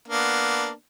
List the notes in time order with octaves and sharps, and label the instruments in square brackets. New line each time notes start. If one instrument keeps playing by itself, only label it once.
[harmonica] A#3 B3 D4